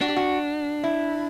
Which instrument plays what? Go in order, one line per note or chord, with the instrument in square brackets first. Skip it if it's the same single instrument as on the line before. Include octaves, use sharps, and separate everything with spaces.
[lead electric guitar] D4 [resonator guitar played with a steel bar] F#4
[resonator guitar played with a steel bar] G4
F#4
E4